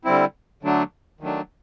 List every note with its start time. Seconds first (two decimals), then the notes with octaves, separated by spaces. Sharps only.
0.05 D3 G3 C4 E4
0.63 D3 F#3 A3 D4
1.20 D#3 F#3 A3 D4